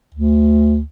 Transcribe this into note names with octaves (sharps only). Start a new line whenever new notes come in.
D2